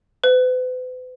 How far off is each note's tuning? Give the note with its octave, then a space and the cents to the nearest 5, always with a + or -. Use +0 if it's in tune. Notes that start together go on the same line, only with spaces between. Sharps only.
B4 +45